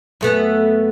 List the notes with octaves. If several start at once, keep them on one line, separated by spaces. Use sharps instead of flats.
F#2 A3 B3